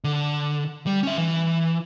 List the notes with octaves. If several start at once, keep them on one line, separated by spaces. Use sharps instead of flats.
D3
G3
C#4 E5
E3